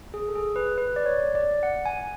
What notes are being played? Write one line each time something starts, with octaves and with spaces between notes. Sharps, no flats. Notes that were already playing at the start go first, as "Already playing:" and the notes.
G#4
A4
G#4
B4
B4
D5
C#5
D5
F#5
G#5